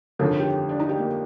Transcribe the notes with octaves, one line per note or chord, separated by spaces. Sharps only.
G1 F2 D#3 A4
G4
D4
D#4
G4
A#3